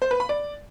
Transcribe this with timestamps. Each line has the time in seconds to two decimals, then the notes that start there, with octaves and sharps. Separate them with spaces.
0.02 C5
0.11 B4
0.20 B5
0.29 D5